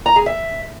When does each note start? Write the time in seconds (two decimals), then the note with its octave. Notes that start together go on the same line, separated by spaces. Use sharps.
0.06 A#5
0.16 G#4
0.26 E5